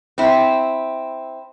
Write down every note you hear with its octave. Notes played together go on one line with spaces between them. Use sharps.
C4 E4